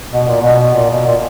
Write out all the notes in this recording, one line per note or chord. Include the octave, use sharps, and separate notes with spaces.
B2
A#2
B2
A#2
B2
A#2